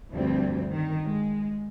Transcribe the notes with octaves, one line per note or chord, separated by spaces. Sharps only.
D2 G2 F3 G3 C4
D#3
G#3